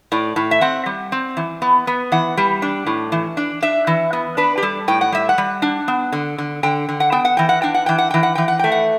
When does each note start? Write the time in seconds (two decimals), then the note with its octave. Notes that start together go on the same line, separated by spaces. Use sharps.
0.12 A2 D5
0.36 A2
0.51 E5
0.61 C4 F#5
0.86 G3
1.12 C4
1.37 E3
1.62 B3
1.87 B3
2.12 E3 F#5
2.37 G3
2.62 D4
2.87 A2
3.12 E3
3.37 D4
3.62 D4 E5
3.87 E3
4.13 B3
4.37 D4 B4
4.58 G4
4.62 G3 A4
4.88 A2 G5
5.01 F#5
5.12 G3 E5
5.29 F#5
5.38 G3
5.62 D4
5.88 B3
6.13 D3
6.38 D3
6.63 D3 G5
6.89 D3
7.00 F#5
7.12 B3 G5
7.25 F#5
7.37 E3 G5
7.49 F#5
7.62 D4 G5
7.74 F#5
7.86 E3 G5
7.98 F#5
8.11 E3 G5
8.23 F#5
8.35 E3 G5
8.48 F#5
8.59 A3 G5
8.72 F#5